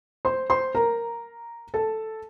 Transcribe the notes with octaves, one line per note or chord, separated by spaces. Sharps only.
C5 C6
C5 C6
A#4 A#5
A4 A5